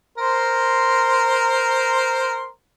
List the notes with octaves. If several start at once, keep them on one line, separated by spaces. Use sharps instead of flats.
A#4 C5 C6